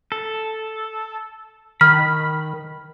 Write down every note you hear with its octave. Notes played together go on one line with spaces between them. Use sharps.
A4
D#3 B5 F6